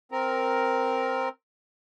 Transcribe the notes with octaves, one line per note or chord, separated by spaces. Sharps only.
C4 A#4